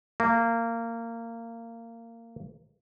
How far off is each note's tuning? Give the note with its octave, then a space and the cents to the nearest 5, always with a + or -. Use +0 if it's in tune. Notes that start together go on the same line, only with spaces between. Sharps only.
A#3 -20